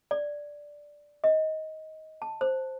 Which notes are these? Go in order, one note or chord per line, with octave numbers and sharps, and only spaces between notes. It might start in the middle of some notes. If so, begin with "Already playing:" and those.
D5
D#5
A5
C5